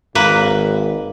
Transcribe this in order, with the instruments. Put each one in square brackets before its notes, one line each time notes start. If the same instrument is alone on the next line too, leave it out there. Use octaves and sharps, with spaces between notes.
[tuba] G#1 [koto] A#3 B4